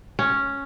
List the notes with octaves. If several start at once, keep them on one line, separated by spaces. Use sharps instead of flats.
C#4